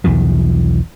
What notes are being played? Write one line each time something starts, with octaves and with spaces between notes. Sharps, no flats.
B1 E2 D#3 F3